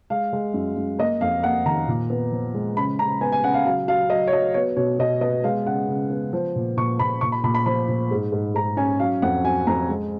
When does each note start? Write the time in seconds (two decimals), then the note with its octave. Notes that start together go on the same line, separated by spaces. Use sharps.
0.10 G#3 F5
0.33 G#3
0.54 F#2
0.76 F#2
0.99 A#3 D#5
1.21 F2 F5
1.43 A#3 F#5
1.66 D#3 A#5
1.88 A#2
2.10 B3
2.32 F3
2.54 G#3
2.77 C#3 B5
2.99 C#3 A#5
3.21 B3 G#5
3.32 G#5
3.43 C#3 F#5
3.54 F5
3.66 F#3 F5
3.88 F#3 F5
4.10 F#3 D#5
4.27 C#5
4.32 F#3 D#5
4.54 B3 C#5
4.76 B2 C#5
4.99 B2 D#5
5.21 B3 D#5
5.44 G#3 F5
5.66 C#3 F#5
5.88 C#3
6.10 B3
6.33 F3
6.56 A#2
6.77 A#2 C#6
6.99 A#2 B5
7.21 A#2 C#6
7.32 B5
7.43 A#2 B5
7.55 B5
7.66 F3 B5
7.88 A#2
8.11 G#2
8.32 G#2
8.55 G#2 A#5
8.77 C#4 G#5
8.99 F#3 F5
9.22 F2 F#5
9.44 F#3 G#5
9.67 F2 A#5
9.88 G#3